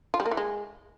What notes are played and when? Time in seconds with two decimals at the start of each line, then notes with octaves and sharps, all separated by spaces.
0.14 F4
0.20 G3
0.26 A#3
0.31 E3
0.37 G#3